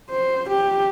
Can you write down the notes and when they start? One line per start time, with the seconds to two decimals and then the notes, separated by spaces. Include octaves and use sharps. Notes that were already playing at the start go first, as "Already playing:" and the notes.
0.10 C5
0.49 G4